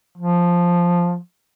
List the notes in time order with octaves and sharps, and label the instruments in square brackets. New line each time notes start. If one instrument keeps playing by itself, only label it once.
[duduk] F3